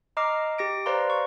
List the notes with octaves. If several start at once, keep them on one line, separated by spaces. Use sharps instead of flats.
D#5 A#5 D6 F6 C7
G4 A#6 D7
B4 C5 D5 F5 A#5 C6
C#6